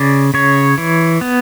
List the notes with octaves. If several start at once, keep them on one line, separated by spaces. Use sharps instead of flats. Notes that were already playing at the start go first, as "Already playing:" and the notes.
Already playing: C#3 D5
C#3 C#5
E3
B3